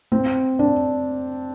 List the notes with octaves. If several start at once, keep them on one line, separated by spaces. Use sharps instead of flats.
C4
D4